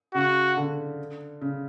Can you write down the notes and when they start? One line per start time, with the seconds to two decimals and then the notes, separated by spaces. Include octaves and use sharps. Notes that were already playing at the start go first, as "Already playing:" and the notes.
0.14 C#3 F#4
0.57 D3
1.41 C#3